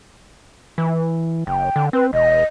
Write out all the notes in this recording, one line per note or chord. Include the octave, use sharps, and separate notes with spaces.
E3
F#1 G5
D3
C4 B4
E1 D#5